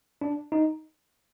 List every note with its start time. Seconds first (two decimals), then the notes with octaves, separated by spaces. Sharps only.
0.21 D4
0.52 D#4